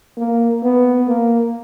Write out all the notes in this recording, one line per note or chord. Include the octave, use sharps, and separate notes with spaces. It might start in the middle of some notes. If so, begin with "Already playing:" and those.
A#3
B3
A#3